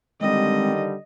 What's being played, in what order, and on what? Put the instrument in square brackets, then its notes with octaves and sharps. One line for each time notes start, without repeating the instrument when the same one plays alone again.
[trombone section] D3 D#3 G3 [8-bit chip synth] G#3 C4 [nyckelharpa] D#5